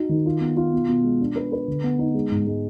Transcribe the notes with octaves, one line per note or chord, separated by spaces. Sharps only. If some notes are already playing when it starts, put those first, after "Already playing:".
Already playing: D#4 F#4
D#3
F4
B3
F4
B2
B2
G#3
D4
B4
B4
D3
B3
D#4
G#3
G#2
G#3